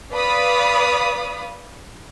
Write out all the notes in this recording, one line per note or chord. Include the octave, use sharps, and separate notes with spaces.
B4 D5 F5 B5 D#6